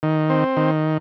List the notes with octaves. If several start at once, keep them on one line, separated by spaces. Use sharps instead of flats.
D#3
C4
D#3